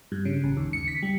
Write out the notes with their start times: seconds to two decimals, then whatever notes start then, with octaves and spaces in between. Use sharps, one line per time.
0.12 G2
0.25 C#3
0.44 A1
0.57 D#2
0.73 C#7
0.88 B6
1.03 G3